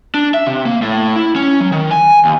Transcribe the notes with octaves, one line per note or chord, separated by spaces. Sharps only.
D4
E5
C3
A#3
A2
E4
C#4
F#3
D#3
G#5
D#2